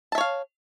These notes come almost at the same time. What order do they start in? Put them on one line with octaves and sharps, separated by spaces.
A5 E5 C#5 F5